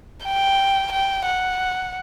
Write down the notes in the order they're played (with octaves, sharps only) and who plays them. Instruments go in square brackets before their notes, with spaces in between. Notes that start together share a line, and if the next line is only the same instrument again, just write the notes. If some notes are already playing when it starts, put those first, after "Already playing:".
[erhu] G5
G5
F#5